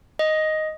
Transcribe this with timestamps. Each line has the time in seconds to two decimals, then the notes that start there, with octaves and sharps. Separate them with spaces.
0.19 D#5